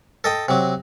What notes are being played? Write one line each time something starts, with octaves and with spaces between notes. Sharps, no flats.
A4 D#5 G5
C3 F#3